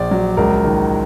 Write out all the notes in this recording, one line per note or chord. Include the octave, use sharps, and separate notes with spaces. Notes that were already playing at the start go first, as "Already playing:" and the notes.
Already playing: A#1 D5
F#3
C#2 A#4
D#3